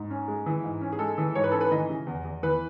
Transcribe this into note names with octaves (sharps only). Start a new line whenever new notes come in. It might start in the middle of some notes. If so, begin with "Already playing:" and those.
Already playing: G#2
C#4
G#3
E3
G#2
C#4
G#4
G#3 A4
E3
G#2 C#5
B4
C#4 A4
B4
E3 D#5
C#3
E2
E2
E3 B4